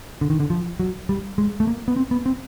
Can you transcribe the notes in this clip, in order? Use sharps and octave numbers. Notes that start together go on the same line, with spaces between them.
D3
D#3
D3
F3
F#3
G3
G#3
A3
A#3
B3
C4
B3
C4